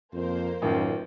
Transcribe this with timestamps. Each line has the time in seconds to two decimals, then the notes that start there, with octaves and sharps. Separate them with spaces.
0.14 F2 A#3 C5
0.62 A1 F#2 D#3 F4